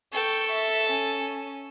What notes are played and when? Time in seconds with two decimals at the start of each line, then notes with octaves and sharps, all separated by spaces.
0.13 A4 G5 C#6
0.52 E5
0.90 C#4